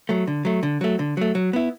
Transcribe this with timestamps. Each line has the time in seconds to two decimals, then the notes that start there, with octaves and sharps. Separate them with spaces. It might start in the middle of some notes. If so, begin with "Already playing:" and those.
0.09 F#3 A3
0.27 D3
0.45 F#3 A3
0.63 D3
0.81 F#3 A3
0.99 D3
1.17 F#3 A3
1.35 F#3
1.53 B3 E4